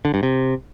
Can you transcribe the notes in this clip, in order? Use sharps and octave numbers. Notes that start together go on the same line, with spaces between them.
D3
G2
C3